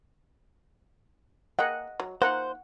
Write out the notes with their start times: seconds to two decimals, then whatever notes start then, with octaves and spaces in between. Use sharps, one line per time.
1.59 A#3 G#4 D#5 F#5 G5
2.00 F#3
2.22 A#3 D#4 F4 C5 F#5